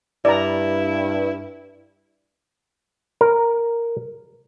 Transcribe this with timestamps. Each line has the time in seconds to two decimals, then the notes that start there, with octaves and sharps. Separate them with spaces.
0.25 G2 E4 D5 A#5
3.21 A#4